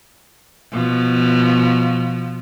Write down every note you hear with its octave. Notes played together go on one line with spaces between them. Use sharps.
B2 F3